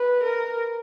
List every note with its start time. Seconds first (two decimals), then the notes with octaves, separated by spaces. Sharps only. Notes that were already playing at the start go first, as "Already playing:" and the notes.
Already playing: B4
0.24 A#4